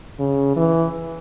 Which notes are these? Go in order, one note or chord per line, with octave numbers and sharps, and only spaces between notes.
C#3
E3